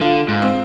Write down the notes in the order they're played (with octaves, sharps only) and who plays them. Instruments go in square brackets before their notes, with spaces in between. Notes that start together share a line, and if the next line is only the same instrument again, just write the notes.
[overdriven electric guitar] D3 [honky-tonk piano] F4
[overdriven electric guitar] G#2
[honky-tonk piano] C4